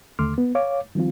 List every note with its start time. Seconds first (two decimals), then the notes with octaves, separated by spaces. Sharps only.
0.19 D#2 D3 A3 C6 D6 F6
0.38 B3
0.55 C#5 F5 D6
0.95 D#3 F3 G3 C4 F4